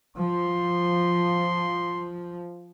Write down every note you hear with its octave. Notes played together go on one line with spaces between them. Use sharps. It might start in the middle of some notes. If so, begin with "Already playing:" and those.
F3 C6